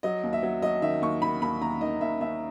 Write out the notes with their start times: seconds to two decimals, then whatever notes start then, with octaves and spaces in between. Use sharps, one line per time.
0.03 F#3 D#5
0.23 D#2
0.33 E5
0.43 F#3
0.62 F#3 D#5
0.82 D#3 E5
1.02 D#2 C#6
1.22 D#3 B5
1.42 D#2 B5
1.61 D#2 A#5
1.81 D#3 D#5
2.01 D#2 E5
2.21 D#2 E5